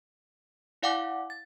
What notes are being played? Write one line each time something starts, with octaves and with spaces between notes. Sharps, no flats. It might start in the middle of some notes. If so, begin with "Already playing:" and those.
E4 D5 F5 F#5 G#5 D6
A6